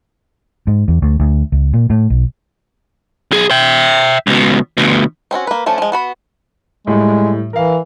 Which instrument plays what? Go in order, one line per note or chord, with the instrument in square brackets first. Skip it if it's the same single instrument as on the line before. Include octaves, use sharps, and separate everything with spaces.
[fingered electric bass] G#2
E2
D2
D2
C#2
A#2
A2
B1
[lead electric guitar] B1 G#4
E5 G5
C#2 B2
D2 B2
[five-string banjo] C4 C#4 E4 F#4
A#3 B4
F3 A3 C#4 D4
F3 G#3
B3 F#4 B5
[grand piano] A2 G3 [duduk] G#3
[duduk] E3 [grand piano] A#4 F5